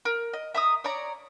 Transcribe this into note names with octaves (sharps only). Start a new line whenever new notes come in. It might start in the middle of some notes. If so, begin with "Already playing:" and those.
A#4
D#5
E5 A#5 D#6
C#5 D5 A#5